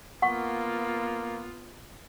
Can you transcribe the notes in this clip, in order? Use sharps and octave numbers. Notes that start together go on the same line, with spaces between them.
A#3 B3 F4 F#5 C#6